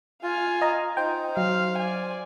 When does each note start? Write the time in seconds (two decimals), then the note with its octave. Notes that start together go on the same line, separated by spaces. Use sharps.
0.23 F4 F5 G#5
0.62 D#5 A#5
0.97 D#4 C5 G5
1.37 F#3 F5
1.78 D5 G#5